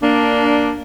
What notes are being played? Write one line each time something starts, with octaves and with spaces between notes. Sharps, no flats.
A#3 D4